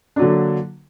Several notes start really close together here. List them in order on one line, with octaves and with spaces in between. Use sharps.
D4 F#3 D3 A#3